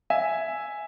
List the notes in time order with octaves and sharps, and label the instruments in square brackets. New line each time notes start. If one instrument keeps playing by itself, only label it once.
[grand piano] E5 G#5